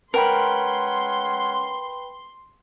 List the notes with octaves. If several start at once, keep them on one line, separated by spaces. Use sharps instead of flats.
G#3 C#4 A#4 B4 F#5 G5 B5 C6